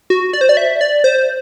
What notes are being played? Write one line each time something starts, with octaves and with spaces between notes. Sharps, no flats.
F#4
D5
C5
D5
E5
D5
C5